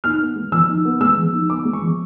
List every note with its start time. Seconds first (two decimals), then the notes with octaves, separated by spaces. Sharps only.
0.04 D#4 F6
0.20 B3
0.36 G#3
0.52 F3 E6
0.68 D#4
0.85 B3
1.01 G#3 E6
1.17 F3
1.33 D#4
1.50 B3 D6
1.65 G#3
1.73 C#6
1.82 F3